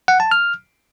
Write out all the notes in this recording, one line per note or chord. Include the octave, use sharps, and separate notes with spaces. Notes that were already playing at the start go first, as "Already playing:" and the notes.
F#5
A5
F6